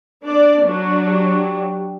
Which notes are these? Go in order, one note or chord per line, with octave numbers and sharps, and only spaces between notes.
D4 D5
F#3 D4
G4